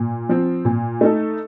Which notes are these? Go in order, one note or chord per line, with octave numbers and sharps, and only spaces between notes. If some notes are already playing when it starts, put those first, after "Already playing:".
Already playing: A#2
F3 C4
A#2
A3 D#4 A4